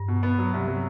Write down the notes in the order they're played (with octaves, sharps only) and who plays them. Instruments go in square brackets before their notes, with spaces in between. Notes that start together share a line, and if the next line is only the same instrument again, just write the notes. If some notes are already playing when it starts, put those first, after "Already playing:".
Already playing: [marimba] G2
[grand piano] B2
B3
F#3
C2
F#3